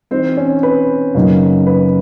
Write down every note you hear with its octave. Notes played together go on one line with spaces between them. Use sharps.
E3 G3 C4 D#4 C5
C#4 C#5
B4
F#2 C#3 F#3 A#3 D#4
B4